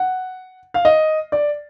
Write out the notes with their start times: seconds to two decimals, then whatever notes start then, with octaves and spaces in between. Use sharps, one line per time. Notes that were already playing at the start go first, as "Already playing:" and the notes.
Already playing: F#5
0.74 F5
0.85 D#5
1.32 D5